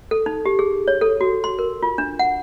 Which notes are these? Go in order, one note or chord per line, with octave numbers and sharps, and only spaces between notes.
A4
D#4
G4
G#4
C#5
A4
F#4
C6
A#4
F4
D4
F#5